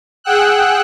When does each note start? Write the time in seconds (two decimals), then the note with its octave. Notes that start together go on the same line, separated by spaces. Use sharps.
0.24 G#4 F#5 G5 E6 F#6